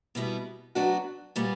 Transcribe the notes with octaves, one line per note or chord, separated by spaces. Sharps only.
B2 G3 B3 E4
F#3 B3 D4 F#4
A#2 G3 B3